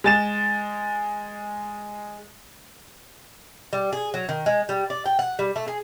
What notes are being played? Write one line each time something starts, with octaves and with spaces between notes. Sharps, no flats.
G#3 A6 E7
G3
G#4
F#3
D#3
G#3
G3
D5
G5
F#5
G3
A3
G#4